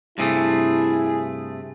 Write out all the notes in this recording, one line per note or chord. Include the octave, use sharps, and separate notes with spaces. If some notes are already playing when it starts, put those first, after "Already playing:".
G2 C3 A3 E4 G#4